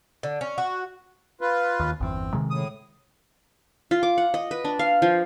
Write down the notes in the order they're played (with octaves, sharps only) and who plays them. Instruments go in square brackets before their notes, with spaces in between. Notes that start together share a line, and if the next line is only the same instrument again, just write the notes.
[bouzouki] D3
C#4
F#4
[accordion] F4 B4
[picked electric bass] D#2
[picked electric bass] G1 E2 [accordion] C4
[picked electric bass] C3 D#3 G#3
[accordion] A2 D#6
[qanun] F4
D6
F#5
D#5
B4
D4
F5
F3